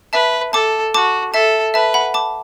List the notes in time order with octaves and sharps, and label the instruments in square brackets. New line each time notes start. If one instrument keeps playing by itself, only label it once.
[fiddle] B4 [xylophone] E5 A5
[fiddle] A4 [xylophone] A5 D6
[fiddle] F#4 [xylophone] A5 D6
[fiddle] A4 [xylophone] E5 A5
[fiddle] B4 [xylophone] E5 A5
[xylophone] F#5 B5
A5 D6